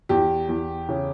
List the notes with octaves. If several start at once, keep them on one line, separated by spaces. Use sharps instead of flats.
E2 G4
E2
C#3